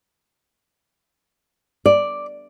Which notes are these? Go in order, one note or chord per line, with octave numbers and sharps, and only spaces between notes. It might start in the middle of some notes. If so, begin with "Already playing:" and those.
D5